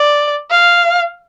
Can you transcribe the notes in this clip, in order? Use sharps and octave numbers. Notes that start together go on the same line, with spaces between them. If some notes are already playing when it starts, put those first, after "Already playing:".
Already playing: D5
F5